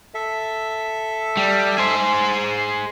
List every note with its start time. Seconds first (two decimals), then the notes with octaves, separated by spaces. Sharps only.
0.14 A4 E5
1.37 G3
1.78 G#4 C5